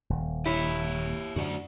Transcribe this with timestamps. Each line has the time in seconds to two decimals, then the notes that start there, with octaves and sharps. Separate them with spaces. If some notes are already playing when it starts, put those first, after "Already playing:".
0.10 D#1
0.46 E4 G4 C#5
1.36 F#2 D3 F#4 D5 F#5